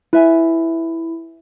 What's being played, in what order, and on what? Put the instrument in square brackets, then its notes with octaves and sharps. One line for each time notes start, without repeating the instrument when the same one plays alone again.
[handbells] E4 [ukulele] B4 E5 G#5